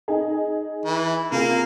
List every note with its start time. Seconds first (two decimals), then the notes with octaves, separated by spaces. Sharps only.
0.08 D#4 G#4
0.86 E3
1.32 C3 A#3 F4 G#4